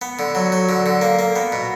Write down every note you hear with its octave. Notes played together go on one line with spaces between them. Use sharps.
B3
D3
F#3
F#3
D3
D3
A#3
A#3
B3
B2